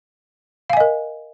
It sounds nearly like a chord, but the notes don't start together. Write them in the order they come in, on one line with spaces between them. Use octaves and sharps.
F5 G#5 D#5 A#4